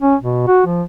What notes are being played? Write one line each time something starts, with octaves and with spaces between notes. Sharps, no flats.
C#4
B2
F#4
F3